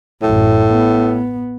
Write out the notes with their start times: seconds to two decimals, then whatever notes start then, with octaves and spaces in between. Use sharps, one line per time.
0.22 A1 F#2 A2
0.71 B3